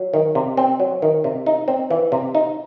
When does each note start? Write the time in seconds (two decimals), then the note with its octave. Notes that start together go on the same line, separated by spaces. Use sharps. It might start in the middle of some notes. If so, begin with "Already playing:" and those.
Already playing: F#3
0.14 D#3
0.35 C3
0.57 C4
0.80 F#3
1.02 D#3
1.24 C3
1.46 D#4
1.68 C4
1.91 E3
2.12 C3
2.35 D#4